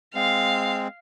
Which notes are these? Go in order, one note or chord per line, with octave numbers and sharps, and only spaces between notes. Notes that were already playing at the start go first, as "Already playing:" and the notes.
G#3 C4 F5